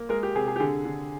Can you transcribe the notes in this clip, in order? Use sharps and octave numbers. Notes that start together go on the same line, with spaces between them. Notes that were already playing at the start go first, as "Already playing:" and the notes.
Already playing: A#3
G#3 A#4
G4
C3 G#4
G#4
G4
D3 G#4
D3